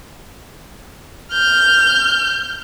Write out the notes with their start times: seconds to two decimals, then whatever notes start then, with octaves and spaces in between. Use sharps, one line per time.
1.32 F6 G6